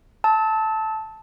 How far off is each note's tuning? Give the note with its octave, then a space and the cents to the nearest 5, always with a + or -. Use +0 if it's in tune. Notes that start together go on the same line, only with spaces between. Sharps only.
A5 +0 E6 -35